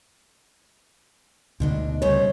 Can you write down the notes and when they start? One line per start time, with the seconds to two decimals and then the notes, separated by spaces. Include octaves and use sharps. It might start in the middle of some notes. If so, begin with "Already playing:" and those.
1.60 D2 G#2 B2 D4 D#5
2.02 C#3 G3 C5 C#5